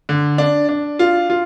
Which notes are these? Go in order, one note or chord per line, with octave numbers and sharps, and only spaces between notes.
D3
D4
D4
F4
F4